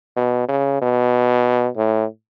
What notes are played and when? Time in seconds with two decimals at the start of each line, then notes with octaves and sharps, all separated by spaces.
0.17 B2
0.49 C#3
0.82 B2
1.76 A2